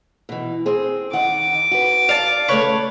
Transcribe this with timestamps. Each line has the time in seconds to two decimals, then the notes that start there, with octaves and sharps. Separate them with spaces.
0.29 B2 E3
0.66 C4 G#4
1.13 D#3 F#5 D6
1.71 F#4 B4
2.09 D5 F5 A5
2.48 C#3 A3 B4 C#5